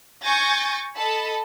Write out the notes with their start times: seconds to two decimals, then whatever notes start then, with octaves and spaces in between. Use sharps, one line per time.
0.23 G#5 C#6 G6 A6 A#6
0.97 A4 D#5 A5 B5